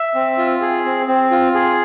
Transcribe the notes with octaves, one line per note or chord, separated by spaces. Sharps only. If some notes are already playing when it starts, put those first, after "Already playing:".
Already playing: E5
C4
F4
G#4
C4
C4
F4
G#4